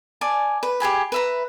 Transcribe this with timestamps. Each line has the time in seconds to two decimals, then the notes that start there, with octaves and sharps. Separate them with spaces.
0.21 D5 G#5 A5
0.63 B4
0.80 G4 G#4 G#5 B5
1.12 B4 E5 A#5